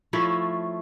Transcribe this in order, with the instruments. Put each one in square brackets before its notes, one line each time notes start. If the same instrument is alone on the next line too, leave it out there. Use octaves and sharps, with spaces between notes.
[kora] F3 A3 E4 C#5